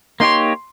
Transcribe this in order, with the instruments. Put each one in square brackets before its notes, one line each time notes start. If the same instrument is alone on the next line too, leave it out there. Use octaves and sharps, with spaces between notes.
[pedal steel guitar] A#3 D#4 G4 C#5 [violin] C6